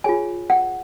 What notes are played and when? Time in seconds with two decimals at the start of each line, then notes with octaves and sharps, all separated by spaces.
0.04 F4 G#4 C#5 G#5
0.50 F#5